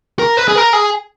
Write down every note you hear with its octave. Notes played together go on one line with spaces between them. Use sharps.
A#4
B4
G#4
A#4
G#4